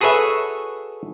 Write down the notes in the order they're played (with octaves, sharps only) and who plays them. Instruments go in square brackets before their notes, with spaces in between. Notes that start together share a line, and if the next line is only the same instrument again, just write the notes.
[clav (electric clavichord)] F#4 G#4 A4 B4 C#5 E5